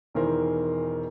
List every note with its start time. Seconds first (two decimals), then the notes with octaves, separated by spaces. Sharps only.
0.14 E1 D#3 E3 A#4 C5